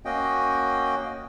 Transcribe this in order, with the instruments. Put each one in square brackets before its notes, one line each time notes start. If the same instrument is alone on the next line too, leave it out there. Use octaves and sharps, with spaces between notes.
[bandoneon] A#3 C#4 F#4 D#5 G5